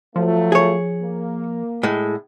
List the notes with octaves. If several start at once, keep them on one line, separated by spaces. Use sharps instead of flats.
F3 F#3 A3 F4
G#4 C#5
A#3
A2 G#3